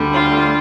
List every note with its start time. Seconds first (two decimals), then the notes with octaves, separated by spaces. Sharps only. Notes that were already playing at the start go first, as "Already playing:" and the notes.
Already playing: D2 D3 G3
0.13 F4